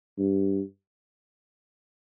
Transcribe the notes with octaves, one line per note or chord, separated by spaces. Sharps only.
G2